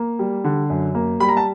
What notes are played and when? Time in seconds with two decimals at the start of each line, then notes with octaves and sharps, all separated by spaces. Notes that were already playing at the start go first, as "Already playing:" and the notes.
Already playing: A#3
0.19 G3
0.44 D3
0.70 F#2
0.95 A#3
1.20 G3 B5
1.29 A#5
1.37 A5